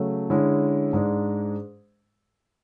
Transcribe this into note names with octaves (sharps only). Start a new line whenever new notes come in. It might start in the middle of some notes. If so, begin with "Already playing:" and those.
Already playing: C#3 F#3 A3
D3 G#3 C#4 E4
G#2 G#3 D4